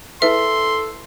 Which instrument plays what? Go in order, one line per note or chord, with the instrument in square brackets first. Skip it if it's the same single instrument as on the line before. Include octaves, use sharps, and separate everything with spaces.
[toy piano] E4 G#4 B4 [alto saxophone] A4 [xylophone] E5 [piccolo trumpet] C6